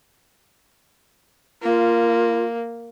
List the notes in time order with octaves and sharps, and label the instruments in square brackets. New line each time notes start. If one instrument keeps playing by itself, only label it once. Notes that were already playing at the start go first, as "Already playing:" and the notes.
[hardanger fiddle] A#3 [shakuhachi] F4